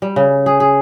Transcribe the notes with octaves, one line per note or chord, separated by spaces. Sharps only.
G3
C#3
G#4
G#4